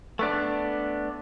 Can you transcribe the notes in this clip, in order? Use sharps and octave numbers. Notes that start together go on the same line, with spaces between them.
A3 B3 D4